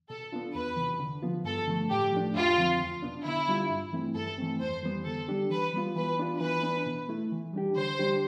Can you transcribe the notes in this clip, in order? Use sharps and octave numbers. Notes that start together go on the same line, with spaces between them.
B2 A4
B3 D4 F4
E2 B4
C3 E3
D3
F3 B3 F4
G2 A4
D3 F3 A3
A2 G4
F3 A3 D4
F2 F4
D3 F3 C4
E2
B2 B3 D4
D3 E4
G3 D4 F4
G2
E3 A3 C4 E4
G2 A4
E3 A3 C4
F2 C5
E3 G3 B3
D3 A4
G3 D4 G4
E3 B4
G3 B3 F4
E3 B4
B3 D4 F4
E3 B4
B3 D4
B2
A3 E4
E3
G3 D4 G4
D3 C5
G3 D4 G4